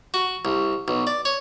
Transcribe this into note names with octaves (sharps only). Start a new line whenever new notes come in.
F#4
C2
B1
D5
C#5